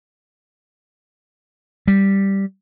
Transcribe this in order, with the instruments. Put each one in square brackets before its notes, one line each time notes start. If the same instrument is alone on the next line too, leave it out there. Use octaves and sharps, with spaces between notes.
[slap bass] G3